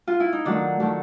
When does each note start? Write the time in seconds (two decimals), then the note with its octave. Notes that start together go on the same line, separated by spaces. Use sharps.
0.07 F4
0.20 E4
0.33 D#4
0.45 D#3 F#3 A3 D4
0.80 D#3 F#3 A3